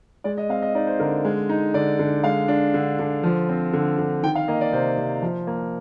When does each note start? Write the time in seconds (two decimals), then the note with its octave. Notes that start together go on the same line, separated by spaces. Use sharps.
0.24 G#3 D5
0.38 D#5
0.49 C4 F5
0.62 D#5
0.75 D#4 D5
0.87 C5
1.00 D3 A#4
1.25 G#3
1.49 D#4
1.74 D3 D5
1.99 D3
2.24 G#3 F5
2.48 D4
2.74 D3
2.99 D3
3.23 F3
3.49 C4
3.73 D3
3.98 D3
4.23 D#3 G5
4.35 F5
4.48 A#3 D#5
4.61 D5
4.73 C3 C5
4.98 C3
5.22 F3
5.47 A#3